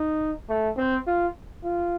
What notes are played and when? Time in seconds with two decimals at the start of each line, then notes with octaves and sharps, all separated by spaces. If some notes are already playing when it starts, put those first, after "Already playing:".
Already playing: D#4
0.49 A3
0.77 C4
1.07 F4
1.64 F4